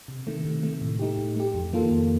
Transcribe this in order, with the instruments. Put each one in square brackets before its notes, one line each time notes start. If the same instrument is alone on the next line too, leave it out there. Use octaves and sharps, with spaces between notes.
[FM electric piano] C3
D#3 A3
C3
D#3 A3
A2
A3 D#4 G4
A2
A3 D#4 G4
F2
D#3 A#3 F4 A4
F2